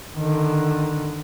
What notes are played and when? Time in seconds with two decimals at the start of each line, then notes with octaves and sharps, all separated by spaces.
0.16 D3 D#3